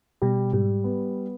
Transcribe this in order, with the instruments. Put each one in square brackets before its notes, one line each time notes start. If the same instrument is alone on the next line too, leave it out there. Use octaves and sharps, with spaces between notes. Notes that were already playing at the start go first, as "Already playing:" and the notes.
[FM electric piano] B2 [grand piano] G3
[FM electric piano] G#2 [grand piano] G3
[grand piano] B3